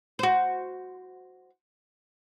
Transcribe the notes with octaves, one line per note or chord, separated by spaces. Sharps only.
F#4 C5